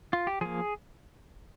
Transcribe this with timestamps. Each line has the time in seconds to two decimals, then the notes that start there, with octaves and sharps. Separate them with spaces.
0.13 F4
0.27 G4
0.41 F3 A#3 G#4